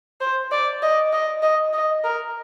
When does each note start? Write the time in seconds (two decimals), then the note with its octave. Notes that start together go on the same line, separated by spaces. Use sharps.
0.21 C5
0.52 D5
0.82 D#5
1.13 D#5
1.43 D#5
1.73 D#5
2.04 A#4